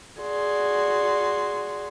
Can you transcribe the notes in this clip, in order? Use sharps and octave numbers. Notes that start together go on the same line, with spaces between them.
F#4 G#4 D5 C6